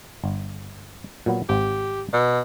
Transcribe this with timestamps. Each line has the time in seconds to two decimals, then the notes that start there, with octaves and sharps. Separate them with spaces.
0.24 G1
1.26 A#2 F#3 B3
1.49 G#1 C4 G4
2.13 B2